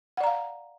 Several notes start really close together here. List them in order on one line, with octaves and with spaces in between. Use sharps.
F#5 D5 A#5 F5